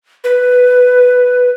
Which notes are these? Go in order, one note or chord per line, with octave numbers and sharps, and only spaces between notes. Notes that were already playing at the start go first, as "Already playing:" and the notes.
B4